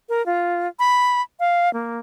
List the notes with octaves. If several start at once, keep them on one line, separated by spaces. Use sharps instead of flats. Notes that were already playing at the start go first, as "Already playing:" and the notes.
A#4
F4
B5
F5
A#3